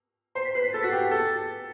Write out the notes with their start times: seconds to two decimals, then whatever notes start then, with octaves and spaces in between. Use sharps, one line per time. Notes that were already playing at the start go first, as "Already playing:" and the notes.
0.35 C5 C7
0.45 B6
0.54 B4 C7
0.64 B6
0.73 A4 A6
0.82 F#4 B6
0.92 G4
1.10 A4 A6